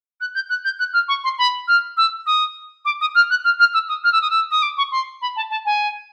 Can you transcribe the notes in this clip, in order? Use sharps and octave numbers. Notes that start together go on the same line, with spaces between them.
F#6
G6
F#6
G6
F#6
F6
C#6
C6
B5
F6
E6
D#6
D6
D#6
F6
F#6
F6
F6
E6
D#6
F6
E6
D#6
E6
D#6
D6
C#6
C6
B5
A5
A5
G#5